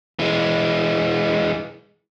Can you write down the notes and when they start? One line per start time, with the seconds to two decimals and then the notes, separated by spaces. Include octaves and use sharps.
0.19 E3 G#3